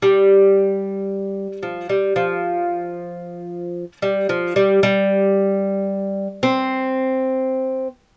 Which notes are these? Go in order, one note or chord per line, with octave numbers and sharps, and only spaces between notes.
G3
F3
G3
F3
G3
F3
G3
G3
C4